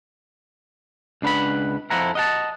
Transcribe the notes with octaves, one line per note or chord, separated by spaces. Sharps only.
C#2 D4 B4 F#5 B5
F2 F3 E4 F#5 A#5
D#5 F#5 A5